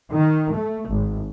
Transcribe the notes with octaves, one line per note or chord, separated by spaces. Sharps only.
D#3
A3
G#1